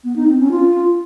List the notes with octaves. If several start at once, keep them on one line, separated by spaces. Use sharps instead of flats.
B3
D#4
C4
C#4
F4